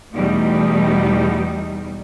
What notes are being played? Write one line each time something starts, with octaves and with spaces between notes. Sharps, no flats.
E2 B2 G3 A3 D#4